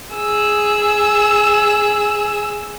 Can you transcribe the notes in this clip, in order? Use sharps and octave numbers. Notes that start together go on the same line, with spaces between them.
G#4 E6